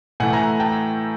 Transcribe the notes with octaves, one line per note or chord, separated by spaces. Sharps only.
A2 E3 A3 F#5 G#5
G#5 A#5
G5 A5